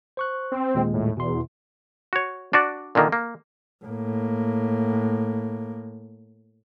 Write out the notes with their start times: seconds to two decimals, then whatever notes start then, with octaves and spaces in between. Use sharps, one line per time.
0.17 C5 C#6 F#6
0.52 C4
0.74 D#2 A#2 G#3
0.93 A2
1.17 E2 B2 C6
2.13 F#4 C#5
2.53 D4 F#4 D5
2.95 A#2 D3 D#3 A#3
3.12 A#3
3.85 A2 A#3